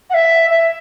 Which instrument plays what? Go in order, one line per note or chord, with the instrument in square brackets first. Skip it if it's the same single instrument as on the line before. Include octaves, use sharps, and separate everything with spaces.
[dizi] F#5
E5
E5